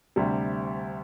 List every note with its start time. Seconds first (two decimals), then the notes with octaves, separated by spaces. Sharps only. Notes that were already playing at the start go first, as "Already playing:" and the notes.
0.16 D2 C3 G3